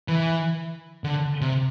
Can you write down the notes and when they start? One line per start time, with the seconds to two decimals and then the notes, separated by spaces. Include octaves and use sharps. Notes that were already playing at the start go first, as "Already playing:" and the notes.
0.08 E3
1.04 D3
1.41 C3